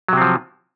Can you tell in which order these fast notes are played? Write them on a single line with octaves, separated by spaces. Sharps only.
F#3 C3 C4 F3